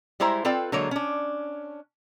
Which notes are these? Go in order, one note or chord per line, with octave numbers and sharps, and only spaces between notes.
G3 G#3 E4 C5 A#5
C4 F4 A4 B4 D5 G5
D3 F#3 G#3 A#3 C#5
C#4 D4